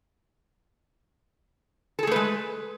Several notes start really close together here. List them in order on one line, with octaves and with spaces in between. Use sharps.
A4 G#4 A3 B4 G#3